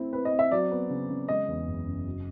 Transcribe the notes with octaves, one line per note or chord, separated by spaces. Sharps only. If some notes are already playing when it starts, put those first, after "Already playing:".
Already playing: A3 C4 E4
C4 B4
D#5
C4
E5
F#3 D5
B3
C#3
C#3
G#3 D#5
E2
F#1
F#1
F#3